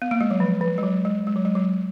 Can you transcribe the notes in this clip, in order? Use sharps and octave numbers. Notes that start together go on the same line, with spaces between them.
B3
A#3
G#3
F#3
F3
F3
G#3
F#3
G#3
G#3
F#3
G#3
F#3